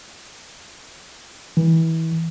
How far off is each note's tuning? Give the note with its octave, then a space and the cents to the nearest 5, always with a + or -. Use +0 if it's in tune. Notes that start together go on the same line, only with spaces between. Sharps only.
E3 -25